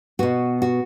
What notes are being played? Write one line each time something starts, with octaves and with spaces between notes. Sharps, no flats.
B2 B3 F#4
F#4